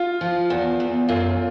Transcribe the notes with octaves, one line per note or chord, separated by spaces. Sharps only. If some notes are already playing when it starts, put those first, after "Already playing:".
Already playing: F4
F3
E2
E2
F#2 F4